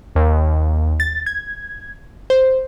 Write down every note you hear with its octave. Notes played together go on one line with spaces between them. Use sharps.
D#2
A6
G#6
C5